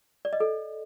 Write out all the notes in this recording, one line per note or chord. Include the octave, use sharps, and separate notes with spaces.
D5
D#5
A4